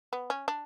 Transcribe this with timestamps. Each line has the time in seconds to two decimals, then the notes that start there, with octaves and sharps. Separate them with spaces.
0.13 B3
0.30 C#4
0.48 D4